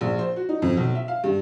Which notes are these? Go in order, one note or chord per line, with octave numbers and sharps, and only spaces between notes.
A#1
C5
F#4
D#4
F2
B1
E5
F5
G2